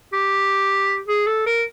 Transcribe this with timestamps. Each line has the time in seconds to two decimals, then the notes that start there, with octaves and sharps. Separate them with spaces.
0.13 G4
1.08 G#4
1.26 A4
1.46 A#4